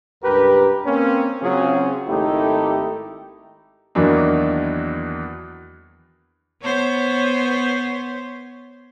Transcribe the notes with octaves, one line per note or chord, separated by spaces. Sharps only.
C#2 G2 G4 A#4 B4
A#3 C4 C#4
C#3 F#3 C4 C#4 F4 G#4
G#1 A3 D#4 E4 G4
E2 D#3 E3 F#3 A#3 D4
B3 C5 C#5